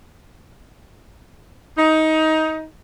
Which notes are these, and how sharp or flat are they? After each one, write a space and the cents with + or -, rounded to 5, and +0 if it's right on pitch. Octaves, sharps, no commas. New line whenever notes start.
D#4 +20